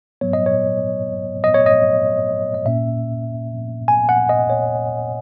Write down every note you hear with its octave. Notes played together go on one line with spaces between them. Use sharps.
G#2 F#3 B3 C#5
D#5
C#5
D#5
C#5
D#5
D#5
A#2 A#3 C#4 E5
G#5
F#5
D#5
C#5